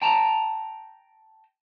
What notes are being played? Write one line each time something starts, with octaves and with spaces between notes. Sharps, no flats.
G5 A5 A#5